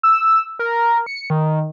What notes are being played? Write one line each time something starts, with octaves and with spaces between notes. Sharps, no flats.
E6
A#4
C#7
D#3